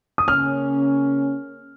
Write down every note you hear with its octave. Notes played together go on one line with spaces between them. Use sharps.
D#6
C#3 A#3 C#4 F6